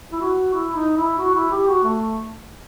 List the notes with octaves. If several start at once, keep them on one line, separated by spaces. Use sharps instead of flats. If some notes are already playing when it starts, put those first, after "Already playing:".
E4
F#4
E4
D#4
E4
F#4
E4
G4
F#4
A3